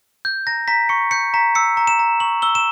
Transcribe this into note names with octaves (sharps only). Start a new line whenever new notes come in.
G6
A#5 A#6
A#5 B6
C#6 C#7
G6 C#7
A#5 B6
E6 C#7
A#5
E7
A#5
C#6 F#7
E6 G7
E7